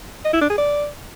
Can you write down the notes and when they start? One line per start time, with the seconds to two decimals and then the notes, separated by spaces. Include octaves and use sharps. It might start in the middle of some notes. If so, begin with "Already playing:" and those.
0.25 D#5
0.33 E4
0.41 D4
0.50 G#4
0.58 D5